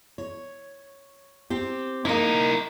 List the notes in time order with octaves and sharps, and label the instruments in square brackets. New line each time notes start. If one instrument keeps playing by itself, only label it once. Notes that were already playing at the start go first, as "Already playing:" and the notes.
[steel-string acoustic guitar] C#5
C4 G4
[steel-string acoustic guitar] A#3 D#4 [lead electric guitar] E4 A#4